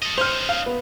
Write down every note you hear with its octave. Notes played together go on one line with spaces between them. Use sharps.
A4 D#5
C#4 D#4 C5 F6
F5
B3